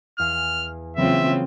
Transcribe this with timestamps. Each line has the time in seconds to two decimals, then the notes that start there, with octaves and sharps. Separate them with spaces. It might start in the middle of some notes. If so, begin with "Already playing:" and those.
0.19 E2 F5 G#5 F6
0.97 C#3 E3 F#3 A#3 C4 F4 E5